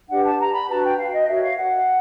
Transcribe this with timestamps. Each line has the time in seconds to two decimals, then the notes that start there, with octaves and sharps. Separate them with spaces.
0.09 D4 G4 B4 F#5
0.24 A5
0.38 A#5
0.53 B5
0.68 D4 F#4 B4 A5
0.82 G5
0.98 F5
1.12 D#5
1.27 F#4 A#4 C#5 E5
1.42 F5
1.57 F#5